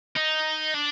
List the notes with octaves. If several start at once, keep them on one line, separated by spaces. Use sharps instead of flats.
D#4
D4